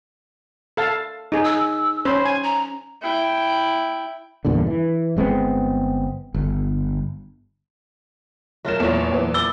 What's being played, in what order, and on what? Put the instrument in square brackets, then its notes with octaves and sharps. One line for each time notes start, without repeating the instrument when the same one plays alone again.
[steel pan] A4 F5 A5
D#4 G#4
[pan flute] E6
[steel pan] C#4 C5 [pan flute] B5
[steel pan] G#5
[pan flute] A#5
[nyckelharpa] E4 G5
[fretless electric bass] E2 G2 A#2 D3
E3
G1 G#3 B3 C4
G1
[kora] F#3 F4 A#4 [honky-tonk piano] A3 E7
[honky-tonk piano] E2 C#5 [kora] A#2 A3
[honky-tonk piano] E2 E3
[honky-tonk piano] B5 D6 A6 [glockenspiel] E6 G7